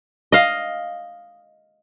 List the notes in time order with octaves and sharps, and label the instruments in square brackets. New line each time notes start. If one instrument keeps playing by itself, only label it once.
[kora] D#5 F5